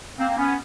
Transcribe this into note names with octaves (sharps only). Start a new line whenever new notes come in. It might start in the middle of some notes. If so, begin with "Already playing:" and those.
A#3 C4
C4
B3 C#4